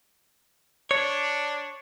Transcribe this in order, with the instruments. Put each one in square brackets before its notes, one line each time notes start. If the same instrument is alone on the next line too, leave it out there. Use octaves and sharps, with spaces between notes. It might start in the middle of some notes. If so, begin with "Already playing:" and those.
[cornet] D4 [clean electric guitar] C#5